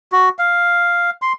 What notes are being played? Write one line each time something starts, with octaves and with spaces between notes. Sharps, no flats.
F#4
F5
C6